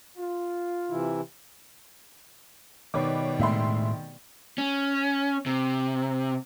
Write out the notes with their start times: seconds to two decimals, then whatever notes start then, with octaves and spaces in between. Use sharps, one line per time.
0.17 F4
0.90 C3 E3 E4
2.94 B2 D#3 G3 B4 C#5 G5 D6
3.39 F1 A2 G#3 E5 C6
4.58 C#4
5.46 C3